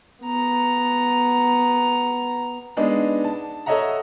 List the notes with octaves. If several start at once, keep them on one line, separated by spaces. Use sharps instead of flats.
B3 A#5
G#3 B3 D4 D#4
A5
A4 C#5 D#5 E5 F#5 A#5